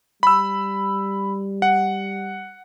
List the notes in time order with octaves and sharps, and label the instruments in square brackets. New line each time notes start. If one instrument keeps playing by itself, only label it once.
[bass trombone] G3 [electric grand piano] B5 E6
[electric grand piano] F#5